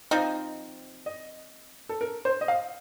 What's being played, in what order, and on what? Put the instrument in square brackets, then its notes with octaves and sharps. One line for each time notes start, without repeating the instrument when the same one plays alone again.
[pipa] F3 C4 D#4 [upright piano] D#5
[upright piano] D#5
A4
A#4
C5
D#5
F5